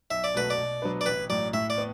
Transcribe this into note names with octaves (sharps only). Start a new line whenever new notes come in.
B1 E5
D5
B2 F#3 A3 F#4 B4
D5
B2
F#3 B3 D4 B4
D5
A1 B4
A2 F#3 D5
A2 E5
D5
B3